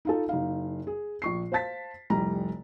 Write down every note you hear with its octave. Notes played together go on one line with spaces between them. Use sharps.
D#4 F4 A4
F#1 D#4 F5
G#4
A#1 C#6 C7
C5 F5 A5 A6 B6
F1 C2 G3 A#5